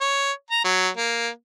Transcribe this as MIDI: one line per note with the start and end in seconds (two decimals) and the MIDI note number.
0.01 0.32 73
0.50 0.62 82
0.64 0.89 54
0.97 1.29 58